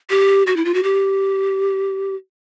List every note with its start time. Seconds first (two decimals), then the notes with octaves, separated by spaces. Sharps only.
0.10 G4
0.47 F#4
0.56 E4
0.65 F4
0.74 F#4
0.83 G4